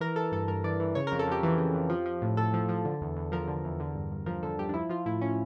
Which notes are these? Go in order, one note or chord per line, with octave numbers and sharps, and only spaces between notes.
E3 A#4
E3 A4
G2 A4
G2 A#4
E3 D5
E3
C#3 C#5
F2 A#4
A4
F2 G4
E3
C#3
F2
F3
F3
A2
A2 A4
F3
F3
D3
E2
E2
F3 A#4
D3
E2
D3
G2
G2
F3 A#4
D3 A4
G2 G4
D4
F3 E4
F3 F4
A2 E4
A2 C#4